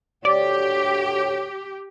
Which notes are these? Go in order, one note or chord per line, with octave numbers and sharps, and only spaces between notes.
D2 G4 C#5 D5